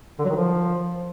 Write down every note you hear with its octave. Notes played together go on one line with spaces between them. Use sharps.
D3
F#3
D#3
F3